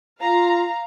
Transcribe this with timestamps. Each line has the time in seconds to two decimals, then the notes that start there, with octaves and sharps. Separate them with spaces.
0.21 F4 F5 A#5